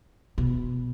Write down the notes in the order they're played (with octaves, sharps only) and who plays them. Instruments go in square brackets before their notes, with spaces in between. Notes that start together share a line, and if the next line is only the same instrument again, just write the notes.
[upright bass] B2